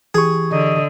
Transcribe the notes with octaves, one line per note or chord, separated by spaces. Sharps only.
E3 G4 G#4 C#6
D3 D#5